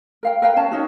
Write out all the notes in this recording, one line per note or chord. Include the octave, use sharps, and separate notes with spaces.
A#4 F5 G5
A#4 B4 F5 G5
C#4 A5
C#4 D#4 F#4